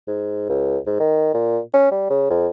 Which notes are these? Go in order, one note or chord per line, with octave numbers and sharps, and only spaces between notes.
G#2
C#2
G#2
D#3
A#2
C#4
G3
C#3
F2